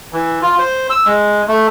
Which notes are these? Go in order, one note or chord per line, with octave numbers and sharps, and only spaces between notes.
E3
F4
C5
E6
G#3
A3